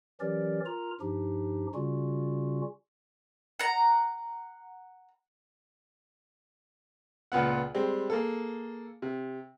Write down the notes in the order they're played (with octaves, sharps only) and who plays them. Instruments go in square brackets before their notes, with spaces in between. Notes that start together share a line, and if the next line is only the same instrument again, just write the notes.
[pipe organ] E3 F#3 C#4 G4 A#4 D5
F4 A#4 A#5
G2 F3 D4 D#4 G4
C#3 G3 C#4 F4 F#4
[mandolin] F#5 A#5
[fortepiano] C#2 A#2 B3 F#5
G3 G#3 C4
A#3 G#4 A4
C3